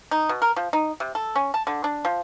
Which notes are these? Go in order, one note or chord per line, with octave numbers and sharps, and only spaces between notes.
D#4
B2
A#4
F3
D#4
C3
A4
C#4
A5
D3
D4
F3